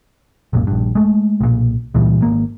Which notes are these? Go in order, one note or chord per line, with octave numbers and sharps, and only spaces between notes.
B1 F#2 A#2
A#1 G2
G#3 A3
B1 A#2
C#2 A#2 E3 G3
G#1 A#3